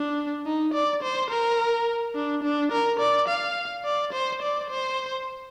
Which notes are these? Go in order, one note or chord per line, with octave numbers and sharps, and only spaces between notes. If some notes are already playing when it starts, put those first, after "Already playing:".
Already playing: D4
D#4
D5
C5
A#4
D4
D4
A#4
D5
F5
D5
C5
D5
C5